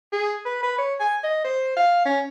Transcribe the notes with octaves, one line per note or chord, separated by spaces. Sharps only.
G#4
B4
B4
C#5
G#5
D#5
C5
F5
C#4